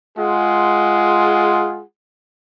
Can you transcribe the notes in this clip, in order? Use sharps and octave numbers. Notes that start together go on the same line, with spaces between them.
G#3 F4 G#4 F#5